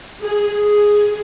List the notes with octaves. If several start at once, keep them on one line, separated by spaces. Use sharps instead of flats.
G#4
G#4